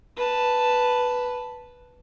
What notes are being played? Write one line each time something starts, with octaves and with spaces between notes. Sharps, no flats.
B4 A5